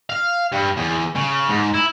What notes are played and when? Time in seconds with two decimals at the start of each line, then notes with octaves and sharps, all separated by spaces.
0.10 F5
0.52 G2
0.77 E2
1.16 C#3
1.48 G#2
1.74 E4